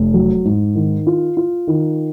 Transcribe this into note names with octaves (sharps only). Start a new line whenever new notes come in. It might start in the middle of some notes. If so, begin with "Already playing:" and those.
Already playing: F1
F#3
G#2
D#3
F4
F4
D#3